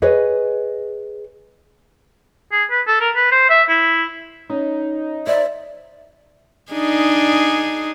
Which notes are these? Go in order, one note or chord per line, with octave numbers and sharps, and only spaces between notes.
G#4 B4 C#5 D#5
G#4
B4
A4
A#4
B4
C5
E5
E4
C#4 D#4
C5 D5 E5
D4 D#4 G#4